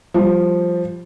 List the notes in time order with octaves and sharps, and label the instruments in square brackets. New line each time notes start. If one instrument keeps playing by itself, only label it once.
[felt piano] F3 G3